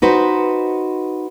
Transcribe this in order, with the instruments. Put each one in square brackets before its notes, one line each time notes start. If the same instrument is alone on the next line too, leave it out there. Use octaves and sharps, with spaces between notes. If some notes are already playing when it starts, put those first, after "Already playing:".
[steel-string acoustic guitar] D#4 F#4 B4 C5